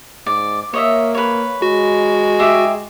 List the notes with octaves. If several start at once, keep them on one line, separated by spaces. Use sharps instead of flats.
G#2 D5
A#3 C#5 D#5 E5
B4 C#5
G#3 F#4
G4 G#4 E5